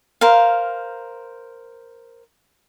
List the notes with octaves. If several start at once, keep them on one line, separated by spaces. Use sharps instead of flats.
A#4 C5 F5